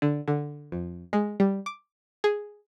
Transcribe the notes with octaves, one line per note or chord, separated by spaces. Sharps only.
D3
D3
F2
G#3
G3
D6
G#4